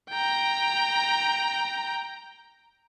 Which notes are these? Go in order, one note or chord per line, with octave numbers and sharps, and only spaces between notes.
G5 A#5